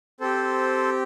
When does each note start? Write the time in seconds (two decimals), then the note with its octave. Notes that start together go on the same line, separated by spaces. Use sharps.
0.20 C4 G4 A4 C5